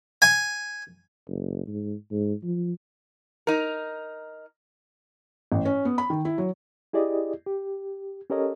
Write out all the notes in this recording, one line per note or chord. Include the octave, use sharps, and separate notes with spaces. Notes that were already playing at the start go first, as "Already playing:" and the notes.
G#5
F#1
G#2
G#2
F3
D#4 A#4
A1
C#4
B3
B5
D#3
E4
F#3
E4 G4 G#4 D5 D#5
G4
C#4 G4 A4 A#4 C#5 D#5